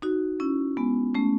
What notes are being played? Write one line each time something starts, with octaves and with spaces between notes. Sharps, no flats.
D#4 F#4
C#4 E4
G#3 B3
A3 C#4